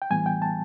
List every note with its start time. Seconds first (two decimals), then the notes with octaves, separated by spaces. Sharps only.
0.02 G5
0.10 A2 E3 G3 B3 G#5
0.26 G5
0.42 A5